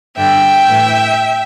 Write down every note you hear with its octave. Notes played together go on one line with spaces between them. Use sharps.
G2 D3 E5 G5
A2 E3